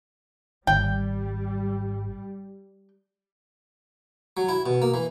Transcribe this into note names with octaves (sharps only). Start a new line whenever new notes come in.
G#1 G3 G5
F#3
E4
B2
A#3
E3